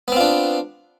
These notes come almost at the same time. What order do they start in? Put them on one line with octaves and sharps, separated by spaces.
B3 C4 F4 D4